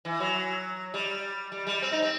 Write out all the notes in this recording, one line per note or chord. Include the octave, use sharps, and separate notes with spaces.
E3
F#3
G3
G3
G3
C4
D#4
C4